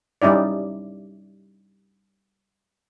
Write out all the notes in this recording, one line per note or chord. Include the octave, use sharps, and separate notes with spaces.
G3 C#4 D#4 E4 D5